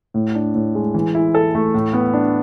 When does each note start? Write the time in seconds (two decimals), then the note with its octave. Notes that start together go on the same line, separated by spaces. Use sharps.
0.14 A2
0.35 D4
0.55 A2
0.75 G#3
0.94 E3
1.15 E4
1.35 A4
1.55 A3
1.74 A2
1.93 B3
2.14 D4